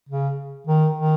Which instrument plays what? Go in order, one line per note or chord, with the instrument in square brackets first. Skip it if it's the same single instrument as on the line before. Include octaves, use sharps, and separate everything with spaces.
[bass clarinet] C#3
D#3
D#3